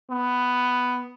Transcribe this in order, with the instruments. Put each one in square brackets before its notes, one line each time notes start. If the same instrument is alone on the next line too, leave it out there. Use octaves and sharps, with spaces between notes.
[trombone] B3